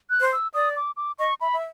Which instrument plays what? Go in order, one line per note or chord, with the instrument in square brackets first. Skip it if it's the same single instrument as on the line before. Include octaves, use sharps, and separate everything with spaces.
[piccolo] F#6
[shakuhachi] C5
[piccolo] E6
[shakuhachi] D5 [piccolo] D#6
[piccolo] D6
D6
[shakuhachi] D#5 [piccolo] C#6
[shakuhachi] E5 [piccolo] B5
[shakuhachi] E5